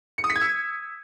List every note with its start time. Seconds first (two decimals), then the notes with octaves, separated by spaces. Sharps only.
0.18 C#7
0.24 D#6
0.30 B6
0.36 G#6
0.41 E6